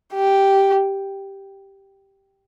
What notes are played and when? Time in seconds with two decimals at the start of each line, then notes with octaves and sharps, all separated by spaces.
0.14 G4